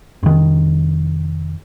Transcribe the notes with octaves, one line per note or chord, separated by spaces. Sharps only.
F1 D#3